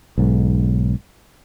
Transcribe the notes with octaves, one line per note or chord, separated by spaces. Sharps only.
B1 G#2